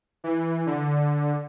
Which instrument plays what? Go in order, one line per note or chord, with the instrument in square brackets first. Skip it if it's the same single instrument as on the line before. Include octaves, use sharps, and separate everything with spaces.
[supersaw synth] E3
D3